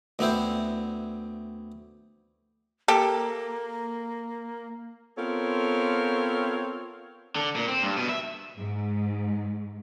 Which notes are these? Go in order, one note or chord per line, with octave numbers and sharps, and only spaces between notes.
D2 B3 C4 E4 C5
A#3 G4 A4
B3 C4 F4 A4 A#4 C#5
D3
A#2
C4
G2
B2
E5
G#2